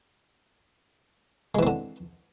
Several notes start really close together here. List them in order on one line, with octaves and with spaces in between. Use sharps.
G#3 E3 C4 D3